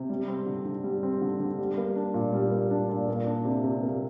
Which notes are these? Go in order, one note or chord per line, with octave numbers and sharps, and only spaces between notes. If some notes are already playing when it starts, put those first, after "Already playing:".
Already playing: C3
G3
C4
D3
D3
G3
C4
D3
D3
G3
A#3
D4
A#2
G3
A#3
D4
A#2
A#3
D4
C3
C3
A#3